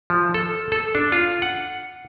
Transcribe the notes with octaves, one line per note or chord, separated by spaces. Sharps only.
F3
A4
A4
D4
F4
F#5